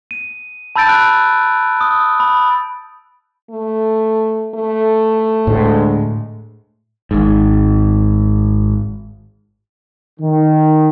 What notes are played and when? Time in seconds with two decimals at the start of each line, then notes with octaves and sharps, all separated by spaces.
0.11 D#7
0.76 A5 B5 E6 G6 A6 D7
0.89 F#6 D7
1.81 D#6
2.20 B5
3.50 A3
4.55 A3
5.47 D2 A2 G#3
7.11 G#1 G#2
10.20 D#3